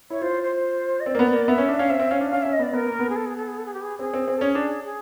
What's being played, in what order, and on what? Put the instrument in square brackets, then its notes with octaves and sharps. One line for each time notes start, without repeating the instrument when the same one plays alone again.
[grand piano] E4 [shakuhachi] C#5
[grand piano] F4 [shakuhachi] C5
[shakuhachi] C5
D#5
[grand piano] C4 [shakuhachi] D5
[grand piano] A#3
B3
A#3
[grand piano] B3 [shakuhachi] E5
[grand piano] C#4
D4
[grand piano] C#4 [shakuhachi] F5
[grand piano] C4 [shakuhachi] E5
[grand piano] C4
[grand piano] C#4 [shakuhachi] F5
[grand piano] D4
[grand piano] C#4 [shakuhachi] F5
[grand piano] C#4 [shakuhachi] E5
[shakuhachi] D#5
[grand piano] B3 [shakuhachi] D5
[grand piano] B3 [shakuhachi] A#4
[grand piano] A#3
B3
[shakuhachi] G#4
A4
G#4
A4
G#4
A4
G#4
G4
G#4
[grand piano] C4 [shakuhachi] G#4
[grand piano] C4
C4
[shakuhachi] A4
[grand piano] C#4 [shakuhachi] G#4
[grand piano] D4
[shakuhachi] G#4